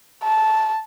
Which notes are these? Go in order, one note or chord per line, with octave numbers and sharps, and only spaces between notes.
A5